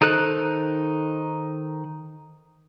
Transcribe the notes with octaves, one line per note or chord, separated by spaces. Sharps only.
D#3 D#4 A4 C5 F#6